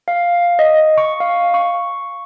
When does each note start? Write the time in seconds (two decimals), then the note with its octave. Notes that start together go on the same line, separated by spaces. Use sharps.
0.08 F5
0.59 D#5
0.98 C#6
1.20 F5
1.54 C#6